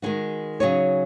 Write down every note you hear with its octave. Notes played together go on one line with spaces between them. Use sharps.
D#3 G#3 D#4 F#4
C#3 F#3 D#4 G#4 C#5